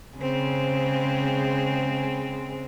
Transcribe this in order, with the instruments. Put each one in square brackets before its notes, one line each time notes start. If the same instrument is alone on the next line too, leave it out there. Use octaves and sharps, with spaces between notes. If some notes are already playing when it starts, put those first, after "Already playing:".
[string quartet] C#3 G#3 C4